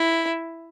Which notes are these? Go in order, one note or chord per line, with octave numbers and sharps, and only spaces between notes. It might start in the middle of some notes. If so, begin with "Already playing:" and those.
Already playing: E4